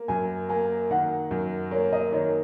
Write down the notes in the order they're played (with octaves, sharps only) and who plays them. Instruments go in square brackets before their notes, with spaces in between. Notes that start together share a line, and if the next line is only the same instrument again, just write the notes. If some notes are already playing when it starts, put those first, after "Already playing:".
Already playing: [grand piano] A#3
[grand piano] F#2 [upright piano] G#5
[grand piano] A#3 [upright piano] G#5
[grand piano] D#3 [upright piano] F#5
[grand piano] F#2
[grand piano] A#3 [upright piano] C#5
[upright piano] D#5
[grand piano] D#3 [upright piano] C#5